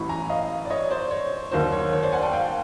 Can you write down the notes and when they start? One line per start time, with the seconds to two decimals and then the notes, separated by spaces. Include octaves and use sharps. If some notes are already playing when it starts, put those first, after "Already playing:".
Already playing: A1 A2 F#3 B5 C#6
0.09 G#5 A#5
0.30 D#5 F5
0.65 D5
0.70 C#5 D#5
0.90 C5 D5
1.11 C#5
1.51 D#2 D#3 F#3 A#3 C5
1.72 C#5
1.93 C#5
2.03 C5 D5
2.12 F#5 G#5
2.22 G5 A5
2.33 F5 G5